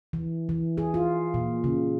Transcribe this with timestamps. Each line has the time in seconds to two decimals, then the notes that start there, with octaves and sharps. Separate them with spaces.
0.13 E3
0.49 E3
0.78 G#4
0.94 F4
1.34 A#2
1.64 C#3